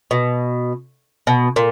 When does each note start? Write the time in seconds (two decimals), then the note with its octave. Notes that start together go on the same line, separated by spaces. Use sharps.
0.11 B2
1.27 B2
1.56 A#2